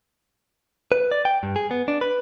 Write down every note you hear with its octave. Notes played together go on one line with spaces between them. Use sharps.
B4
D5
G5
G2
G#4
B3
D4
B4